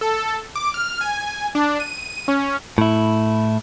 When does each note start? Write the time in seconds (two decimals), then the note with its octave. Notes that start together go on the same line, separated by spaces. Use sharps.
0.01 A4
0.56 D6
0.74 F6
1.01 G#5
1.55 D4
1.80 D#7
2.28 C#4
2.78 A2 E4